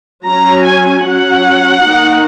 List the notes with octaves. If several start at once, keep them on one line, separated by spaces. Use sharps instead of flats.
F#3 C#4 A#5
G#5
F#3 C#4 F#5
D#3 A#3 D#4